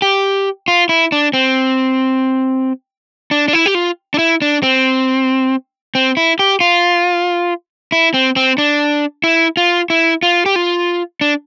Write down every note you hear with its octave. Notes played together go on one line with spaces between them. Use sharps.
G4
F4
E4
D4
C4
D4
D4
E4
G4
F4
D4
E4
D4
C4
C4
E4
G4
F4
E4
C4
C4
D4
E4
F4
E4
F4
G4
F4
D4